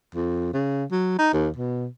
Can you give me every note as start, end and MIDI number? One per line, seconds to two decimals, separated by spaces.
0.15 0.48 41
0.53 0.84 49
0.91 1.16 54
1.19 1.32 63
1.33 1.49 39
1.56 1.87 47